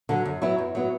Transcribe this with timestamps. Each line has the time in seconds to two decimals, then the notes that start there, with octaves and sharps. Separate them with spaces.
0.09 D3 F#3
0.25 F#2
0.42 F#3 B3 E4
0.58 F#2
0.75 F#3 B3 E4